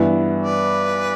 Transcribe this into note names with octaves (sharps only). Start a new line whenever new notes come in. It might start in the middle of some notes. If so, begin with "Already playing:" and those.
Already playing: G2 E3 B3 E4
B4 D5